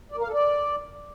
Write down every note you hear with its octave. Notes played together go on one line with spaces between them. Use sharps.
D5
A#4
F5
A4
D5